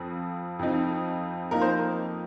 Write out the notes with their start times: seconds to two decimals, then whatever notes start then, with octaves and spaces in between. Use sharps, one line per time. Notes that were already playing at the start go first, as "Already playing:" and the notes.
Already playing: F2 F3 C4
0.59 F2 F3 C4 D#4
1.51 F2 F3 A#3 D#4 A#4
1.61 C5